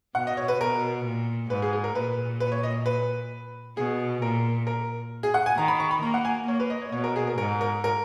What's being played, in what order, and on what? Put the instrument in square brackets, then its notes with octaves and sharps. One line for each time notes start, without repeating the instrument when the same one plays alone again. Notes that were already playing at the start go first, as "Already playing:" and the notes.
[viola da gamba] B2 [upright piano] F#5
[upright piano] D#5
C#5
B4
[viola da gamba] B2 [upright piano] A#4
[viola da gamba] A#2
[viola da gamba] G#2 [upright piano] B4
[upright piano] G#4
G#4
A#4
[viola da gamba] A#2 [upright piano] B4
[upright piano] B4
C#5
D#5
B4
[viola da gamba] B2 [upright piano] G#4
[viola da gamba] A#2 [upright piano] A#4
[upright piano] A#4
G#4
F#5
G#5
[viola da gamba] D#3 [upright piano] A#5
[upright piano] B5
C#6
B5
[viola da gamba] A#3 [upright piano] A#5
[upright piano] F#5
G#5
[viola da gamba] A#3 [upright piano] C#5
[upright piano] B4
D#5
C#5
[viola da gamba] B2 [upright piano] C#5
[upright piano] A#4
G#4
A#4
[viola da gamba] G#2 [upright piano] A#4
[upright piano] A#4
A#4